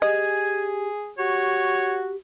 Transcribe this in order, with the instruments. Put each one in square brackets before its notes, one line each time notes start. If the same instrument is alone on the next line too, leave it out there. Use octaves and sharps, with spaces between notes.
[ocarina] G4 [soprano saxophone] G#4 [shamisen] D#5 [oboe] G#5
[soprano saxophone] F#4 [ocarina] G4 [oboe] C#5